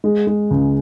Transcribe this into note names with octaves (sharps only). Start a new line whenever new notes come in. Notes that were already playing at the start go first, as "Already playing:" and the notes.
G#3
G#3
C#2